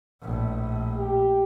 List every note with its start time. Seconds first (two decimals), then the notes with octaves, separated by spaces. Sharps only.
0.22 A#1 A2
0.97 G4